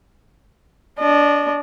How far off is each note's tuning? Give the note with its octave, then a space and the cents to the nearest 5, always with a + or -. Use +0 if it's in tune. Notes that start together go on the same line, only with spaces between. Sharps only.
D4 -20 D#5 -40